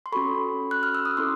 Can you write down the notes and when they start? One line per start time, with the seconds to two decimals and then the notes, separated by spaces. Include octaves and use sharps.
0.06 C6
0.12 C#4 F#4 A4 B5 C#6
0.71 F#6
0.83 F6
0.95 E6
1.05 D#6
1.17 C#4 E4 A4 C6 D6